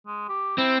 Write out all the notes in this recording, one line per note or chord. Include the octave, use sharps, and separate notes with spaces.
G#3
G4
C4 E4